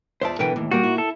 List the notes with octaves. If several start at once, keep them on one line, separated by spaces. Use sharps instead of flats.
E2 F4 C5 D5 E5 A5
B2 D3 E3 A#4 B4 G5
D#2 A2 E3
A#2 G3 A#3 F#4 A#4
E4
A4